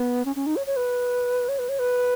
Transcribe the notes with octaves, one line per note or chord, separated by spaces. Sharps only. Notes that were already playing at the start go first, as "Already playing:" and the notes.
Already playing: B3
C#4
C#4
D#4
C#5
C#5
B4
C#5
B4
C#5
B4